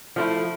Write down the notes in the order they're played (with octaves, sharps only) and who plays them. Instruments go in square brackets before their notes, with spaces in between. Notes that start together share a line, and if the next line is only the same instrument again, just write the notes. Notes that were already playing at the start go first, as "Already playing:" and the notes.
[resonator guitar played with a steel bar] F3 A3 E4